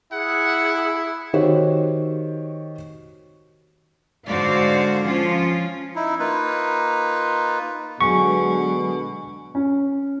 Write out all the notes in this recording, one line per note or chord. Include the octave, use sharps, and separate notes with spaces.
E4 G#4 F#5
D#3 F#4 G4 C5 C#5
G#2 D3 F#4 C5 D5 F5
F3 C#4 F4
D#4 E4
A#3 D#4 F4 B4
B2 D3 F#3 G#3 B3 G#4 G#5 C#6
C#4